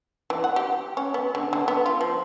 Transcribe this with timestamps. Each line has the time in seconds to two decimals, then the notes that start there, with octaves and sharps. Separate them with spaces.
0.30 E3
0.44 F#5
0.56 G4
0.97 C#4
1.14 B3
1.35 D3
1.53 D3
1.68 B3
1.86 F4
2.01 F3